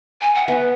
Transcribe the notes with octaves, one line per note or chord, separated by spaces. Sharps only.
G#5
F#5
B3 E5